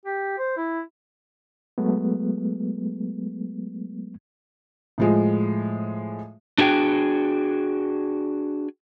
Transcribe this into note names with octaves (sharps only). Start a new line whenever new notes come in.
G4
C5
E4
F#3 G#3 A3 B3
A2 F3 G#3
D4 F#4 G#4 G5